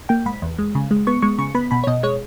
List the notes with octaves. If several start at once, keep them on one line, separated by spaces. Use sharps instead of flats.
A#3 G5
G#2 B5
E2
G#3
C#3
G#3
B3 C#6
G#3 C#6
C#3 C#6
B3 B5
B2 B5
C#5
B2 D#5
G#3 C#5